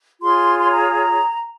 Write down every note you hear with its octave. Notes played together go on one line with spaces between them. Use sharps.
F4 G#4 C#5 C6
C6
A#5